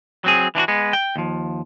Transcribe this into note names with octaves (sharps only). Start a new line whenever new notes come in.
F#3 C4 G#4
E3 D4 F4 F#4
G#3 B3
G5
D#2 F3